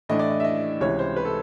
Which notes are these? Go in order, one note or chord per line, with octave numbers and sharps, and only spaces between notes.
A2 E3 A3 D4 D#5
D5
D#5
E5
D#5
C#2 C3 E3 C#5
C5
B4
A4